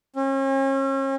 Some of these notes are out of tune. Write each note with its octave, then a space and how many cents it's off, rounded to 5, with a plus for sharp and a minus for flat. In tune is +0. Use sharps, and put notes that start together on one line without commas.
C#4 -40